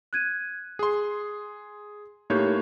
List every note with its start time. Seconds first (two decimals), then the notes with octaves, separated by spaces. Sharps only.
0.13 F#6 G#6 D#7
0.79 G#4 C6
2.30 A2 A#3 D#4 G4 C#5 G6